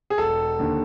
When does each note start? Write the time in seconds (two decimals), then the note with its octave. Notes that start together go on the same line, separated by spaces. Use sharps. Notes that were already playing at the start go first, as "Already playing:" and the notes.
0.10 G#4
0.18 E1 A4
0.59 D#2 D3